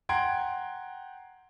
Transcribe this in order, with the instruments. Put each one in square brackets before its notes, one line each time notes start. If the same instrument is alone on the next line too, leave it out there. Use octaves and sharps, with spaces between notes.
[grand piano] F#5 G5 A#5 C6 G#6 D7